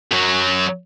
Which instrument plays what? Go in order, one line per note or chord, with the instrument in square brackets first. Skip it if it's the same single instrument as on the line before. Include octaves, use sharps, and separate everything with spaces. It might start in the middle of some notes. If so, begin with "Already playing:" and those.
[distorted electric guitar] F#2 F#3